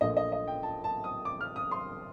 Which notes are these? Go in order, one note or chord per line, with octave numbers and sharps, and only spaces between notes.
A#1 A#2 F3 A3 D#5
D#5
D#5
G5
A5
A5
D#6
D6
F6
D#6
C6